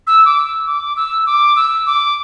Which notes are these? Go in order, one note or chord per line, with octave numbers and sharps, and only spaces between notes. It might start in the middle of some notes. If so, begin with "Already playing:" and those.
E6
D6
E6
D6
E6
D6
E6
D6